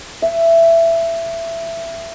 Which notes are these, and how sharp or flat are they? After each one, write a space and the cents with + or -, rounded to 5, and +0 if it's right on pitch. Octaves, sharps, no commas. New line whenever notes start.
E5 +15